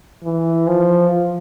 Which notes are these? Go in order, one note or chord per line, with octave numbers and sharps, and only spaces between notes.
E3
F3